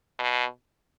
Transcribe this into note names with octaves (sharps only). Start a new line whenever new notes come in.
B2